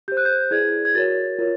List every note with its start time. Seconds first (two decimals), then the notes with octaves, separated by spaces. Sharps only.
0.08 G4 C5 G6
0.17 F#6
0.25 G6
0.51 E4 G#4 B4 D5 G#6
0.85 G#6
0.94 F#4 A#4 C#5 A6
1.39 F4 A#4 C#5